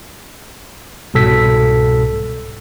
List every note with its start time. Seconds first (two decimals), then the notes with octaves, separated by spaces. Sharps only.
1.14 C2 G#2 B2 A4 E6 B6